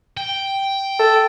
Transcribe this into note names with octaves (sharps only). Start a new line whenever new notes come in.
G5
A4